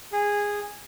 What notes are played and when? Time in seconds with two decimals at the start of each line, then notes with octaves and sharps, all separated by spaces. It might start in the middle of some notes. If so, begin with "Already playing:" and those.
0.13 G#4